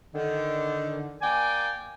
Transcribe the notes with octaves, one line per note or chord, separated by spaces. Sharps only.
D3 D#3
A#3 D5 G5 G#5